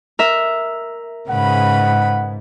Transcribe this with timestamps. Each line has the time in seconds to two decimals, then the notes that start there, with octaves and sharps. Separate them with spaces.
0.19 A#4 E5
1.30 G#2 C#3 B4 F#5 B5